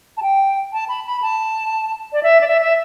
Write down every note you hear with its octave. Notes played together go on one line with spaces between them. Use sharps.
A5
G5
A5
B5
B5
A5
D5
E5
D5
E5
E5